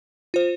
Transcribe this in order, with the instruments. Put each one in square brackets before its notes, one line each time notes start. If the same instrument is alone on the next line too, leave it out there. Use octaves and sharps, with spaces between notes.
[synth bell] F4 C5